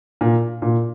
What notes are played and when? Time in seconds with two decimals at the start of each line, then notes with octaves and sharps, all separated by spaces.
0.21 A#2
0.62 A#2